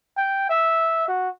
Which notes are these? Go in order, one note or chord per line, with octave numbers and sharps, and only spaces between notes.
G5
E5
F#4